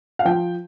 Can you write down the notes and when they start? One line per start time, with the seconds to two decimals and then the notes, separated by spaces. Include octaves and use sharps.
0.19 F5
0.25 F3 G5